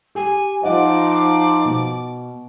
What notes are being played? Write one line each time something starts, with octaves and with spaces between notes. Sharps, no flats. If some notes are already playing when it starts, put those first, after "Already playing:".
G4 G#5
F3 D#4 D#5 F#5 D6
B2